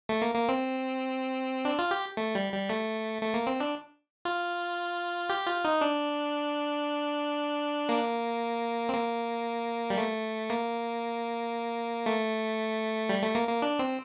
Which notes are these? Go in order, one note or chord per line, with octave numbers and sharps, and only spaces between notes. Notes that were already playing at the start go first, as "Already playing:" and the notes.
A3
A#3
A#3
C4
D4
F4
G4
A3
G3
G3
A3
A3
A#3
C4
D4
F4
G4
F4
D#4
D4
A#3
C4
A#3
G3
A3
A#3
A3
G3
A3
A#3
A#3
D4
C4